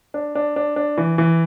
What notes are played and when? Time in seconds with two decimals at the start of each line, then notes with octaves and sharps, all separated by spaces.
0.14 D4
0.35 D4
0.56 D4
0.76 D4
0.97 E3
1.18 E3